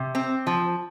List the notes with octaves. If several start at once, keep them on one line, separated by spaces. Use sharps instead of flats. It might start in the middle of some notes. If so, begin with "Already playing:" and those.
Already playing: C3
C4
F3